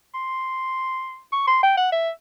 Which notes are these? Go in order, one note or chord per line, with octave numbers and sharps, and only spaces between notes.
C6
C#6
C6
G5
F#5
E5